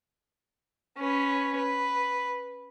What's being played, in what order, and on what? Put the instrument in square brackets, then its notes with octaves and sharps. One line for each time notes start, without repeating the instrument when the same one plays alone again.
[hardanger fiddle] C#4 B4
B4